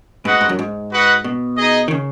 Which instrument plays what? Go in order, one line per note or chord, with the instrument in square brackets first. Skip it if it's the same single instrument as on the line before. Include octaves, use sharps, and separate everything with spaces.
[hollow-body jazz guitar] G#2 [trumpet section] F#4 B4 D#5 F#5
[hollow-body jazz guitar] G#2
F#2
G#2
[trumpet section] F#4 B4 D#5 F#5
[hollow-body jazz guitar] B2
[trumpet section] D#4 G#4 D#5
[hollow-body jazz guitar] D#3
C#3